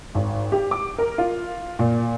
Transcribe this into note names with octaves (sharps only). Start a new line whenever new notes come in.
G#1
G4
D6
A#4
F4
A#2